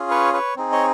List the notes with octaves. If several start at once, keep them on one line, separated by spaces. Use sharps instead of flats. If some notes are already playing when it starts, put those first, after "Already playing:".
Already playing: C#4 F4 G#4
B4 C#5
B4 C#5
C4 D#4 G#4
C#5 D#5